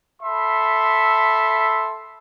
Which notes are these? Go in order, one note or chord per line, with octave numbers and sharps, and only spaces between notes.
A4 E5 B5 C6